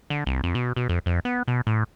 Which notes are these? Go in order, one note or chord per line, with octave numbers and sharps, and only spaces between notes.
D3
C2
F2
B2
B2
F2
F2
B3
B2
A2